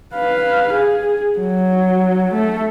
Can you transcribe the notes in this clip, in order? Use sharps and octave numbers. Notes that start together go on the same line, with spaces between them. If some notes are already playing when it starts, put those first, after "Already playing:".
B4 F5
G#4
F#3
A3